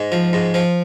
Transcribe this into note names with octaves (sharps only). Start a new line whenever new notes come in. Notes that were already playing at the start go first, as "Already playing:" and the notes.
Already playing: G#2
F3
G#2
F3